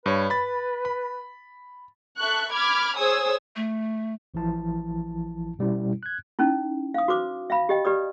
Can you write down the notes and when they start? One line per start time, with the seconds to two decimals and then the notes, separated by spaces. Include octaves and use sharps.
0.06 G2 B4 C#5
0.30 B5 A6
0.85 B5
2.19 A4 E5 C#6 F#6
2.52 B5 D6 F6 G#6
2.97 G#4 C5 C#5 G#5 D#6 E6
3.56 A3
4.34 A1 E3 F3 E4 A5
5.59 B2 G3 C#4 E4
6.03 F#6 G#6
6.39 C#4 D#4 E4
6.94 F5 D#6
7.08 F#4 B4 C5 D6
7.50 E5 F5 B5
7.69 G4 D#5 G5
7.85 G4 B4 D5 D#6